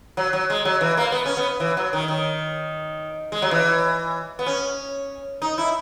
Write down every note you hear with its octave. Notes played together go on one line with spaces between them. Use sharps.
F#3
F#3
G#3
F#3
E3
A#3
B3
C#4
B3
E3
F#3
D#3
D#3
G#3
F#3
E3
B3
C#4
D#4
E4